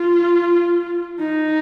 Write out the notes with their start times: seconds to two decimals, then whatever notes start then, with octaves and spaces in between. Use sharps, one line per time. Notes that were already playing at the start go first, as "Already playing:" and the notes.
Already playing: F4
1.20 D#4